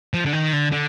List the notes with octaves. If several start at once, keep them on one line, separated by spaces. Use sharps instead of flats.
F3
D3
D#3
D3
D3